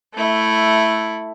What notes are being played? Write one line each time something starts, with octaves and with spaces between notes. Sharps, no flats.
A3 E4